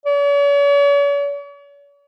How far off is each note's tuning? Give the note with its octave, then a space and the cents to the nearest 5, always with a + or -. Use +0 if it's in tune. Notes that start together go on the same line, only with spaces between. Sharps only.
C#5 +45